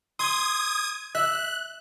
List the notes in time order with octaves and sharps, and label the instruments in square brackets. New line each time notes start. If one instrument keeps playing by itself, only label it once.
[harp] C6 [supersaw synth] D#6 G#6
[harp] E5 [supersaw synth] F#6